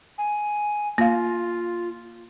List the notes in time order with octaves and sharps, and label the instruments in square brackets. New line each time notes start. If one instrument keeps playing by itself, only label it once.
[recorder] G#5
[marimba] A#3 F5 [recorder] F4